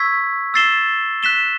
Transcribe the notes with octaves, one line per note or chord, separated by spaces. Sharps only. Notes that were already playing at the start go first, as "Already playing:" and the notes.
Already playing: C#6 E6 G#6 B6
E6 A6 C7 E7 G7
F#6 B6 E7 G7